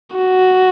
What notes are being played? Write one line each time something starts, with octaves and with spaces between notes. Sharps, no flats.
F#4